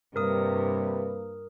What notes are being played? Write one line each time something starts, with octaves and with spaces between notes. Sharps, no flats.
G2 C3 A#3 A#4 B4 D#6